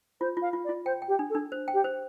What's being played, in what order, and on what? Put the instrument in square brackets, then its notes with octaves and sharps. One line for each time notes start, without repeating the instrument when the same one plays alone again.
[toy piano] F4 [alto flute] C5
[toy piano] F4
[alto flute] F5
[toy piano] F4
[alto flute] D5
[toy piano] F4
[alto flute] C5 [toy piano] G5
[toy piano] G5
[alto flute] G4
[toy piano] D4
[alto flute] A4
[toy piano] D4
C5
G5
[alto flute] G4
[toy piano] C5